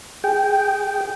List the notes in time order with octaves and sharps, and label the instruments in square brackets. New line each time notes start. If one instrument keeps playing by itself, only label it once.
[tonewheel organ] G#4 G5